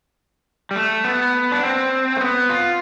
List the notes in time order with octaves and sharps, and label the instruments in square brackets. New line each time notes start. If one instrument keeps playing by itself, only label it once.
[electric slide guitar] G3
A3
B3
D4
C4
A3
B3
F4